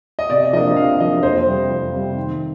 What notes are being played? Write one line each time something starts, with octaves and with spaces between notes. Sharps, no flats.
D#5
C3 D5
F3 A#3 D4 D#5
C3 F5
F3 A#3 D4 D#5
F2 C5
C3 G3
F2
C3 G3
D#3